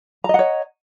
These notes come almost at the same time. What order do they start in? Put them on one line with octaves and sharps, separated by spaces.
A#5 D#5 F#5 C#5